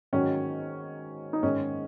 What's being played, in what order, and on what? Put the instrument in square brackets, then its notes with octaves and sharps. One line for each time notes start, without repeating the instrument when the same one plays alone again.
[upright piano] G#2 D#3 F#3 C#4
D#4
G#2 D#3 G#3 C#4